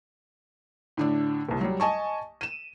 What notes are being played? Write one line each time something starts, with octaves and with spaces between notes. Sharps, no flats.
A2 D3 D4
F#1 C2
F#3 G3
D#5 G#5 A5 C#6
D#7 E7